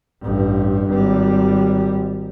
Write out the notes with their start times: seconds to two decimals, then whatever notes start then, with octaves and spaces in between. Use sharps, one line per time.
0.22 A1 G2
0.89 G#1 G3